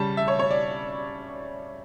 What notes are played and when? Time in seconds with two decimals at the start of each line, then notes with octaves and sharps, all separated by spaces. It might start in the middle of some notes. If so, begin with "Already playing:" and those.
Already playing: C#3 G3 A5
0.17 E5
0.28 C#5
0.39 C#5
0.51 D5